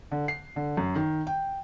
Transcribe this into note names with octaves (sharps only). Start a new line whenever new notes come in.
D3
C7
D3
F#2
D#3
G5